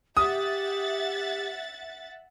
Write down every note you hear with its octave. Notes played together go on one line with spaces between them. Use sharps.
G4 E5 F#5 D#6 A6